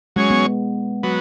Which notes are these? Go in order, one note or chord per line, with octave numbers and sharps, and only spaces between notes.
F#3 G#3 C#4 G#4 C#5
B3
F#3 B3